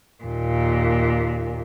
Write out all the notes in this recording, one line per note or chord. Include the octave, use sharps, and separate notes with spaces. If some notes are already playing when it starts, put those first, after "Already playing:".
D#2 A#2